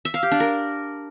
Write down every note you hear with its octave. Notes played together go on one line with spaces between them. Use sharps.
E5
F5
G4
D4
A#4